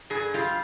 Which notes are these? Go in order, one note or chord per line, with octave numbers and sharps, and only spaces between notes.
G2 G#4
G3 F4